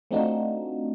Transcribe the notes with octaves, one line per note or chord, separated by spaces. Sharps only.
A3 C4 D4 D#4 F4 F#4